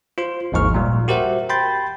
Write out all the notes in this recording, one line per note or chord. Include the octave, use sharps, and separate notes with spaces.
F4 C5 C6
G#1 D#2 G#2 F3 C#6 F6
A#2 G3
F#4 G4 A#4 C5 E5 F#5
G5 B5 C6 G6 A6